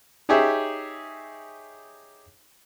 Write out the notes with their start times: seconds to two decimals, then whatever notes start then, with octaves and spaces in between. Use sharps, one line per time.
0.29 D#4 G4 G#4 C#5 E5